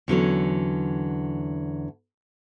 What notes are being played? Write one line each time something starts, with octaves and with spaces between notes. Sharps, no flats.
E2 D3 F#3 C#4